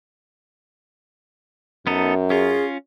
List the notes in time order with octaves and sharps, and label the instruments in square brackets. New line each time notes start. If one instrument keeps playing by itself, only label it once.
[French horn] F#2 [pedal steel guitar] B3 D#4 A4
[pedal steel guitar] C#4 F4 [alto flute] G#4